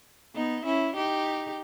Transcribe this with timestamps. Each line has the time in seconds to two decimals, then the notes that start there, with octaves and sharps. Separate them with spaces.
0.35 B3 D#4
0.65 C#4 E4
0.96 D#4 G4